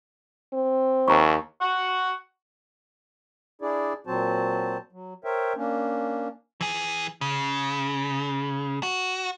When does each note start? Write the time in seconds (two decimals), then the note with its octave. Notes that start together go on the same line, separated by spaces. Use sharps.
0.53 C4
1.08 D#2 A5 A#5 C#6
1.61 F#5 C#6
3.62 D4 E4 G#4 D5
4.07 A#2 F#3 C4 F#4 C5 A5
4.92 F#3
5.24 A#4 C5 C#5 E5 G5
5.56 A#3 C#4 D4
6.61 E3 G#4
7.21 C#3
8.83 F#4